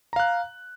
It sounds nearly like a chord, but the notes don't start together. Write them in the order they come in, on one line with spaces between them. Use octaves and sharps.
A#5 F5 F#6